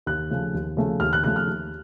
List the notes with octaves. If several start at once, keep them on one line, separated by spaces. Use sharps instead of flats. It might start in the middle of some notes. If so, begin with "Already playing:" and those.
D#2 F#6
C#3 F3 A3
D#2
C#3 F3 A3
D#2 F6
F#6
C#3 F3 A3 F#6
F6
D#2